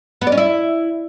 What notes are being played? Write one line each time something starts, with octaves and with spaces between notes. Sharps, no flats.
B3
D5
C#4
E4